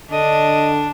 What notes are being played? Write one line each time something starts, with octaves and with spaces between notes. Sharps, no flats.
D3 D4 D#5